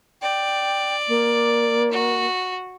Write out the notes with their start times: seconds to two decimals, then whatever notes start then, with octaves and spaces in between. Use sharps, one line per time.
0.22 D5 G5
1.08 A#3
1.92 F#4